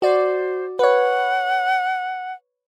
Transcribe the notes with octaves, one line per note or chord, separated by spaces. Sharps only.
F#4 C5 D5
B4 C#5 F#5